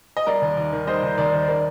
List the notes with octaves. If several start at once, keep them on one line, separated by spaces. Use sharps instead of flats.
D#5
G3 A#4 D5
D#2
D#2
D#3
G3 C5 D#5
D#2
D#2 A#4 D5
D#3
D#3 A#4 D5